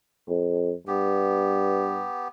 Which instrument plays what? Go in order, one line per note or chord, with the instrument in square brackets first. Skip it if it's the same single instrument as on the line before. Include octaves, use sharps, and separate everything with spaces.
[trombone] F2
[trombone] G2 [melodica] B3 G4